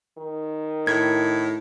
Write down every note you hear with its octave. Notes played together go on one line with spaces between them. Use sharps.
D#3
A2 G#6